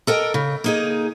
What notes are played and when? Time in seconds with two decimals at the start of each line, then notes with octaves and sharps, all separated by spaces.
0.07 A4 A#4 D#5 G5
0.34 C#3
0.64 A#3 D#4 G#4